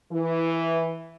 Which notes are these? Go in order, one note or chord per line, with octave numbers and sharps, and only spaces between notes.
E3